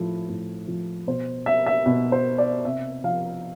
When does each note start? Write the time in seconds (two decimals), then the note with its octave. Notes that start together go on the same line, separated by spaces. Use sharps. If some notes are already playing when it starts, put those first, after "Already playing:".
Already playing: A2 F3
0.29 A2
0.68 F3
1.07 B2 C5
1.46 E5
1.66 E5
1.86 B2
2.12 C5
2.38 D5
2.65 C3 E5
3.04 F3 F5